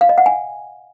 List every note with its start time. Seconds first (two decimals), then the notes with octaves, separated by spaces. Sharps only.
0.01 F5
0.09 D#5
0.18 F#5
0.26 G#5